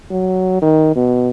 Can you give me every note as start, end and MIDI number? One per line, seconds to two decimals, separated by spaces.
0.11 0.57 54
0.62 0.93 51
0.96 1.30 47